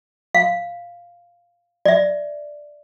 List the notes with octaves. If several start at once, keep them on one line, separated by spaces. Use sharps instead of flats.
F5
D5 E5